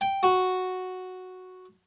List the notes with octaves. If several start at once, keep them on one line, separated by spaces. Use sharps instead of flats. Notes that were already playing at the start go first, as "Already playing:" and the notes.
G5
F#4